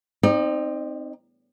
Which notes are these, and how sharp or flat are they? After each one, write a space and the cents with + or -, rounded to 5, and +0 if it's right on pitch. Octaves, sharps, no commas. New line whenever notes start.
C4 +5 D#4 +0 D5 +45